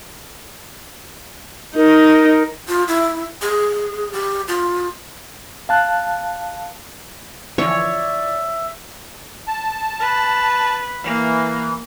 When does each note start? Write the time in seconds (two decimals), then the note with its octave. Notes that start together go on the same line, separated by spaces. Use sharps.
1.76 D#4 A#4
2.68 F4
2.88 E4
3.42 G#4
4.13 G4
4.48 F4
5.69 F5 A5 F#6
7.58 D3 E3 F3 C#5 D5 E5
9.47 A5
10.00 B4
11.04 E3 A#3